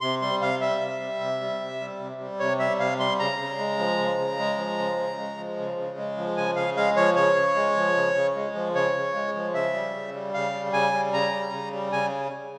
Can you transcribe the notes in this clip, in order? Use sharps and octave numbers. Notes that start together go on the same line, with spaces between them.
C3 C6
G3 C6
C3 F5
G3 E5
C3
G3
C3
G3
C3
G3
C3
G3
C3 C#5
G3 E5
C3 F5
G3 C6
C#3 A#5
C#3
G#3
F3
C#3
C#3
G#3
F3
C#3
C#3
G#3
F3
C#3
C#3
G#3
F3
C#3 G#5
C#3 F5
G#3 F5
F3 C#5
C#3 C#5
C#3
G#3
F3
C#3
C#3
G#3
F3
C#3 C#5
C#3
G#3
F3
C#3 E5
G3
C#3
G3
C#3 F5
G3
C#3 G#5
G3
C#3 A#5
G3
C#3
G3
C#3 G#5